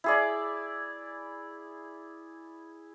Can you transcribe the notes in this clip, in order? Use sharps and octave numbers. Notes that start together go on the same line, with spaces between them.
E4 G#4 D5